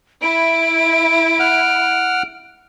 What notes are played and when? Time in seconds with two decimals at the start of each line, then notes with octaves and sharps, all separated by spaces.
0.22 E4 D7
1.40 F#5 F6